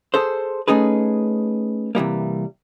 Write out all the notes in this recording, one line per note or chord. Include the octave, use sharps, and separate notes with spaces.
G#4 A4 C5
A3 C#4 D#4 G#4 B4
C3 E3 G3 A#3